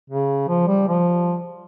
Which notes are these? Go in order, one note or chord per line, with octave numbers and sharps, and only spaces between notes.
C#3
F3
G3
F3